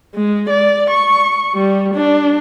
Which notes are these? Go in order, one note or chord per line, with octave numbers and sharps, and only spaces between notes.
G#3
D5
C#6
G3
D4